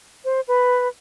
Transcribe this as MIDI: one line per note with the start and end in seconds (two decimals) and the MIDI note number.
0.25 0.41 72
0.48 0.88 71